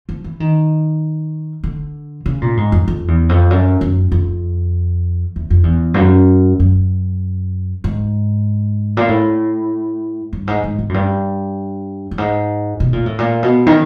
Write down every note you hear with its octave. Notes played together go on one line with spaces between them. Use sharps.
F3
E3
D#3
D3
C#3
A#2
G#2
F2
F2
E2
F2
F#2
F#2
F2
E2
F2
E2
G2
F#2
F#2
G#2
A#2
A2
G2
G#2
G#2
G#2
F#2
G2
G2
G#2
B2
A#2
A2
A#2
B2
D#3